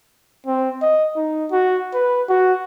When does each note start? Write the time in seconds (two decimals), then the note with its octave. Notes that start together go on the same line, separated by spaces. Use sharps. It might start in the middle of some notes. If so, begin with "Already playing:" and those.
0.46 C4
0.82 D#5
1.16 D#4
1.51 F#4
1.93 B4
2.29 F#4